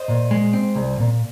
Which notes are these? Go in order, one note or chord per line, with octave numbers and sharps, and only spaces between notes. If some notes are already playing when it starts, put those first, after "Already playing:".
Already playing: C5 D#5
A#2
G#3
C4
C2
A#2